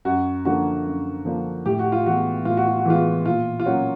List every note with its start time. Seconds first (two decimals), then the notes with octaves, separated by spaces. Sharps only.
0.05 F#2 F#4
0.45 D3 F3 A#3 D4 F#4
0.85 F#2
1.25 D3 F3 A#3 D4
1.66 A2 G4
1.79 F#4
1.92 F4
2.06 E3 G#3 B3 F#4
2.45 A2 F4
2.57 F#4
2.67 F4
2.79 F#4
2.85 E3 G#3 B3 F4
3.25 A#2 F4
3.60 F4
3.66 F#3 A#3 C#4 F#4